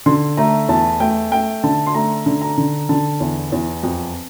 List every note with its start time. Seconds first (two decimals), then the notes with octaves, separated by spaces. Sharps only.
0.06 D3 C6
0.37 A3 A#5
0.69 E2 A5
1.00 A3 G5
1.31 A3 G5
1.64 D3 A5
1.87 C6
1.94 A3 A#5
2.26 D3
2.41 A#5
2.58 D3
2.89 D3 A5
3.20 E2
3.52 E2
3.83 F2